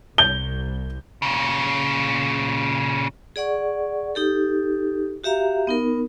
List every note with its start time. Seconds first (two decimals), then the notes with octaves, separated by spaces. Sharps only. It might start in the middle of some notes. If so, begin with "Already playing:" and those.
0.18 C2 G6 G7
1.22 A#2 C#3
3.36 G#4 D5 F#5 C#6
4.15 D#4 G4 A4
5.24 F#4 G4 E5 F5 A#5
5.67 B3 D#4 A#4